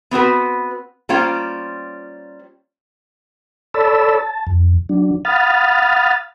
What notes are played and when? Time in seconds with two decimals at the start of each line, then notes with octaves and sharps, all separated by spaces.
0.11 B3 C4 F#4 B4
1.09 G3 A#3 C#4 F4 C5 G5
3.74 A4 C#5 D5 A5 B5 E6
4.18 A5
4.47 F2
4.89 F#3 D4
5.25 F5 F#5 B5 D#6 F6 A6